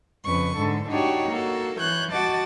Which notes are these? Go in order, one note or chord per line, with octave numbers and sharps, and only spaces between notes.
F2 C#3 B4 C#6
G#2 D3 A4
D4 D#4 F#4 G4 C#5
A#3 F#4 A4
E3 C#5 F#6 G6
F#4 D#5 A5 D6 A6